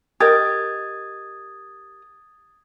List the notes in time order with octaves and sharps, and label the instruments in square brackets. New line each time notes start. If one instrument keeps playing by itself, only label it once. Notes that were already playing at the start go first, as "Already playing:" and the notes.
[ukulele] G4 A#4 D#5 [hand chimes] D#6 G#6 A6